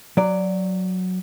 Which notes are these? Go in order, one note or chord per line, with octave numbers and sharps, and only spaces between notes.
F#3 D5